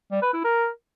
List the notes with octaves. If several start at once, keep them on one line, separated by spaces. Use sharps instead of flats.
G3
B4
E4
A#4